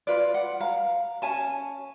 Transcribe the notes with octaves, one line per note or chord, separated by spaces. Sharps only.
F4 B4 D5
F#5
F5 A#5
C#4 G#5 A5